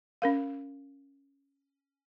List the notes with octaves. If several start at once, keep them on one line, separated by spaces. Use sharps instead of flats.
C#4 A#4 F5